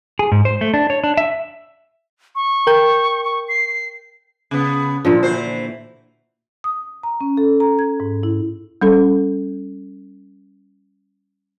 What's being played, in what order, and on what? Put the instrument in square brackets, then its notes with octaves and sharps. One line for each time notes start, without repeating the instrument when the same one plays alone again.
[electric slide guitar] G#4
G#2
C5
A3
D4
C#5
D4
E5
[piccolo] C#6
[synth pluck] A#4 G5 G6
[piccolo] C#6
C7
[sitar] C#3 B3
[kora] A#2 D3 F3
[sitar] E3 C5 [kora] F#4
[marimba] D#6
A#5
C#4
A4
A#5
G#6
G#2
E4
G3 C#4 A4